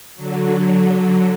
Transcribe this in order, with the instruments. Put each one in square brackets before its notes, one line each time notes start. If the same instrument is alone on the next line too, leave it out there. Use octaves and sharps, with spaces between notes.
[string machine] D3 F#3